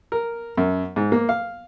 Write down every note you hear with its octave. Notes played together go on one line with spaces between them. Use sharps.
A#4
F#2
G#2
A#3
F5